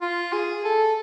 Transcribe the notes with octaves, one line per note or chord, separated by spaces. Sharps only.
F4
G#4
A4